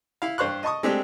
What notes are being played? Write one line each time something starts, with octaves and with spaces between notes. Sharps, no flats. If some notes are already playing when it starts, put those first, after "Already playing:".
E4 F5
G2 C5 F5 C#6 F#6
D#5 A5 C#6 D#6
G#3 A3 C4 D4 G4